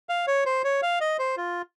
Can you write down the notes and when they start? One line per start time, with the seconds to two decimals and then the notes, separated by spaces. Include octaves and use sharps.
0.09 F5
0.27 C#5
0.46 C5
0.64 C#5
0.83 F5
1.01 D#5
1.19 C5
1.37 F4